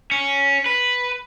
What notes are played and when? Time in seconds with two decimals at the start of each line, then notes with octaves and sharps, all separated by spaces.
0.11 C#4
0.66 B4